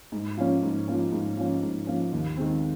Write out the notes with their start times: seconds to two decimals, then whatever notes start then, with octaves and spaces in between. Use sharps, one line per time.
0.12 G#2
0.38 F3 A#3 C#4
0.63 G#2
0.88 F3 A#3 C#4
1.12 G#2
1.37 F3 A#3 C#4
1.63 G#2
1.87 F3 A#3 C#4
2.13 D#2
2.37 D#3 G#3 C4